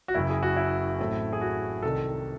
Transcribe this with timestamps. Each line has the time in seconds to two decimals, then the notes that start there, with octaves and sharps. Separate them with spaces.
0.08 F#4
0.14 F#1 F#2 C#3 E4
0.30 G#4
0.43 F#4
0.56 E4
0.99 A1 A2 F#3 A3 C4
1.33 G#4
1.41 F#4
1.82 C2 C3 D#3 A4